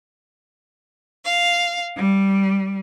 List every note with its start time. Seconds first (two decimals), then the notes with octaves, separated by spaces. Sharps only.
1.24 F5
1.96 G3